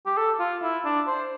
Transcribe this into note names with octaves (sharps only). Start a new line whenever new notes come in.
G4
A4
F4
E4
D4
C5